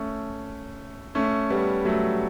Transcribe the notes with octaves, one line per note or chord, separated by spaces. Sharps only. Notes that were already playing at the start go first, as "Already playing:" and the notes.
Already playing: A3 C#4
A3 C#4
G3 B3
F#3 A3